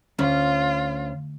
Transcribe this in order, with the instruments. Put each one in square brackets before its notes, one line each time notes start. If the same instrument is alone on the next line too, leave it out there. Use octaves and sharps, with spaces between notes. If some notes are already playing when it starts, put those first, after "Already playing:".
[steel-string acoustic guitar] D2 [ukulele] C#4 [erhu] F4